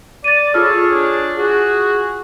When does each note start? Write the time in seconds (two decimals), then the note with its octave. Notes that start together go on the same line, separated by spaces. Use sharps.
0.24 D5 A6 D#7
0.54 F4 G#4 A4 C#5 F6
0.92 D4
1.38 F#4 G#4